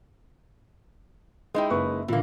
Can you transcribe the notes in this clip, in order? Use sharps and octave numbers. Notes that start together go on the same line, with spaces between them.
G#3 D#4 E4 D#5 G5
F#1 B4 C#6
A#2 D3 E3 A#3